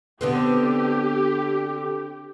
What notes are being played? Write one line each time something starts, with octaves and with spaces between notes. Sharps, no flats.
D3 B3 C4 G4